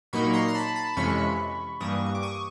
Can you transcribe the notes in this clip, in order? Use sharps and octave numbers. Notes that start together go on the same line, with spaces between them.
A#2 F#3 A#3 D#4 B5 C#6
A#5 C6
C6
A5 B5
A5 B5
F2 C3 E3 G#3 C#4 B5 C#6
G2 E3 G3 A#3 C#6 D#6
C#6
D6
C#6 D#6